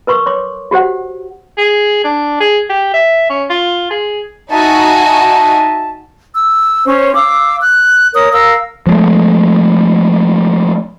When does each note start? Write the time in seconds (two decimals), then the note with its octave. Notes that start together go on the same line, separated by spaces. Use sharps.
0.07 A#4 B4 C6 C#6
0.26 C#5 C6 D6
0.71 F#4 G4 C5 F#5
1.58 G#4
2.05 D4
2.41 G#4
2.70 G4
2.94 E5
3.30 C#4
3.50 F4
3.91 G#4
4.50 D#4 F#4 D#5 E5 G#5 A5
6.34 E6
6.86 C#4 C5 C#5
7.15 F5 D6 E6
7.61 F#6
8.14 A#4 C#5 D#6
8.33 A#4 F5 E6
8.87 F3 G#3 A3